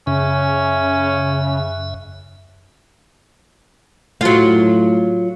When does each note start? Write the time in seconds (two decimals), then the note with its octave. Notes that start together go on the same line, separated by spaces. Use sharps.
0.07 F#2 C#3 C#4 E5
4.21 A2 F#3 F4